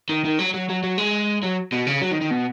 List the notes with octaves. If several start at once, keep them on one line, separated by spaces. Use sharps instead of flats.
D#3
D#3
F#3
F#3
F#3
F#3
G#3
F#3
B2
C#3
F#3
D#3
D#3
B2